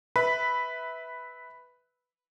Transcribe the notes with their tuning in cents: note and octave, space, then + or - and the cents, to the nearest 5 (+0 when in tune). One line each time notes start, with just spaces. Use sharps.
B4 +0 E5 -15 B5 +0